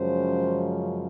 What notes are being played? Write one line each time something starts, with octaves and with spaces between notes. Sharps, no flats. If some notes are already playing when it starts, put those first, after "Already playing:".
Already playing: F#2 C#3 F3 G#3 C5